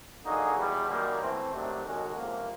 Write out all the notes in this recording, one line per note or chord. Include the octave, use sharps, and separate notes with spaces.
D3 F#3 A#3 D#4 G#4
E2 B2 G3
F#2 D#3 G3 A#3
E3 A3 C4
C3 D#3 F#3 A3 D4
D#3 G#3 C#4 F#4 A4
C#2 C3 F3 A#3